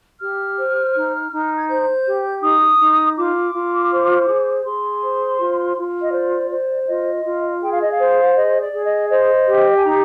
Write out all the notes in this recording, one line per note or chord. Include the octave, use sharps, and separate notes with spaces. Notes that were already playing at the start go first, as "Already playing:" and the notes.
G4 F6
C5
D#4
D#4
G#6
C5 G6
G4
D#4 D#6
D#4
F4 D6
F4
C5
G#4
G#4 C6
C5
F4
F4
D#5
C5 D5
C5
F4 D#5
F4
G#4 G5
F5
D#5
F5
C5
G#4 D#5
D5
G#4
D#5
C5 D#5
G4
G#5
D#4 A#5